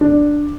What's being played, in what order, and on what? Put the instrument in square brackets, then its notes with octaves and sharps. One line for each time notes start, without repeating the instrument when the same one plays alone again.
[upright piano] D4